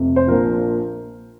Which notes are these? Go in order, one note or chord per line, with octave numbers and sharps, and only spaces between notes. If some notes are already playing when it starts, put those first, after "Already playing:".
Already playing: F1 F2 C3
C5
A#1 A#2 F3 A#4